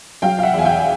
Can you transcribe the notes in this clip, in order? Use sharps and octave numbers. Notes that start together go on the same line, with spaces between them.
F#3 F5 G5
F5
E5 F#5
E2 G#5
F5 G5